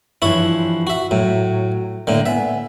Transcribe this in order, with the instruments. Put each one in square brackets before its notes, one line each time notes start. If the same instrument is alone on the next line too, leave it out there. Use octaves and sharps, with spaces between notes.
[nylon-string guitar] G2 E3 F3 [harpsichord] E4 C#5
[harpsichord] F#4 E5
[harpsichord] A2 [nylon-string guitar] F#3
[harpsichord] A2 D3 [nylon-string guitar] A#3
[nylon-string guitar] B3 G#5 [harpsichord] E5